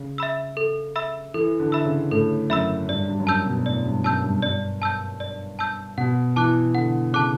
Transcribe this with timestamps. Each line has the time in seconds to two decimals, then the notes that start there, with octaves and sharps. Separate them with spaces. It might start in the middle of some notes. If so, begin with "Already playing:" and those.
Already playing: C#3
0.18 E5 B5 E6
0.57 A4
0.96 E5 B5 E6
1.34 E3 A4
1.59 D3
1.72 E5 B5 E6
1.85 C#3
2.11 A2 A4
2.50 F#2 E5 B5 E6
2.89 G2 D5
3.08 G2
3.20 F#2
3.27 G2 A5 E6 G6
3.46 B2
3.65 A2 D5
3.85 G2
4.04 F#2 A5 E6 G6
4.24 G2
4.42 G2 D5
4.82 A5 E6 G6
5.20 D5
5.59 A5 E6 G6
5.97 B2 F#5
6.36 E3 A5 D6 F#6
6.75 D3 F#5
7.13 C#3 A5 D6 F#6